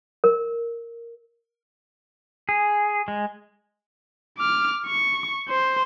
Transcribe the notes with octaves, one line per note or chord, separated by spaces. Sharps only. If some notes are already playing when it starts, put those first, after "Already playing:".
A#4
G#4
G#3
D6 F6
C#6
C5